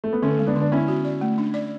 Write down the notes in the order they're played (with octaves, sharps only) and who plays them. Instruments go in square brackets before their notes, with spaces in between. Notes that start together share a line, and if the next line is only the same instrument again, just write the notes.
[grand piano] A3
B3
[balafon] D3 [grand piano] A3 C#4
[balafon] G#3
[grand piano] B3 D4
[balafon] D3
[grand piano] D4
[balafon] B3 [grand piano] C#4 E4
[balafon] F#4
D5
A3
D4
D5